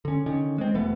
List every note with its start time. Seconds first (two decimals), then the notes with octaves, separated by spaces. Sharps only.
0.05 D3 C#4
0.26 D3 D#3 C#4
0.58 G#3 C4
0.74 E1 E3 A3 B3